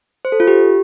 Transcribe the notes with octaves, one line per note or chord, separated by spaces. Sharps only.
C5
A4
F4
G4